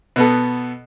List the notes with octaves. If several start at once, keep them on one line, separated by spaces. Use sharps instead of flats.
B2 B3 A4